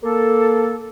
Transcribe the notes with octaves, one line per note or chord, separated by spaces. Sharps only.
A#3 A4